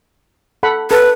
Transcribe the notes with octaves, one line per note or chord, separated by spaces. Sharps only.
A4 F#5 B5
A4 B4